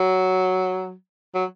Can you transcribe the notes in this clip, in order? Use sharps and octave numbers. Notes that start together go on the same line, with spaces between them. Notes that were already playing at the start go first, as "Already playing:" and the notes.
Already playing: F#3
F#3